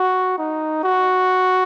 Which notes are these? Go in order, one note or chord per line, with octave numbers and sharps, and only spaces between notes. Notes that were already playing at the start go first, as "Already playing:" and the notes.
Already playing: F#4
D#4
F#4